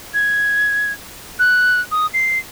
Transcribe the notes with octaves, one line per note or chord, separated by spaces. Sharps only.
G#6
F#6
D#6
C7